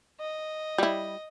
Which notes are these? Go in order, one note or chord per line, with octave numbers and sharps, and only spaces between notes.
D#5
G3 E4